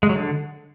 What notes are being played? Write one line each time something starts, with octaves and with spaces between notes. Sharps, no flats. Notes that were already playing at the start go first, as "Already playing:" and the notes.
G#3
F#3
D3